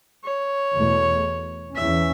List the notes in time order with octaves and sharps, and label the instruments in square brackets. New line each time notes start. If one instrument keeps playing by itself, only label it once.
[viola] C#5
[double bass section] E2 B2 A3
[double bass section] E2 E3 C#4 [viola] E5